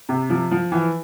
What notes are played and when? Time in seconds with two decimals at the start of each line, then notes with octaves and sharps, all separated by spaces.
0.09 C3
0.30 F3
0.51 F3
0.72 E3